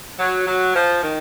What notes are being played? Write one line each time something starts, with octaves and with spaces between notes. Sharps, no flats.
F#3
F#3
F3
D#3